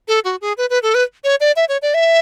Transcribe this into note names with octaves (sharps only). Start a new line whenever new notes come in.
A4
F#4
G#4
B4
B4
A4
B4
C#5
D5
E5
C#5
D5
E5